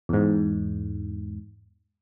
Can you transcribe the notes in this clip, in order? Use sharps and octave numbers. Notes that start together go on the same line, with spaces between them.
E2 G#2